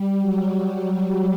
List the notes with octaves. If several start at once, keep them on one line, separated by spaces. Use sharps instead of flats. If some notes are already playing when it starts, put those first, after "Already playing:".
Already playing: G3
F#3
G3